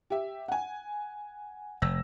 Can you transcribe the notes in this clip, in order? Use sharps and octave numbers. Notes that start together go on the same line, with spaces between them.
G4 E5
F#5 G#5
F1 E6 A#6